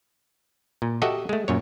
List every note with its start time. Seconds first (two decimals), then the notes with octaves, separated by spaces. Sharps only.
0.82 A#2
1.02 F#4 G4 A4 D#5 E5 F#5
1.29 G#3 A3
1.48 F#2 A#2 C#5